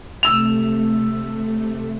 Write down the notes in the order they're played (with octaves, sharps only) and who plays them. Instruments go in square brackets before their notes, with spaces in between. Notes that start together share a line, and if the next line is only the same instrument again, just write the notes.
[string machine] C3 A3 [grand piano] E6 E7 F7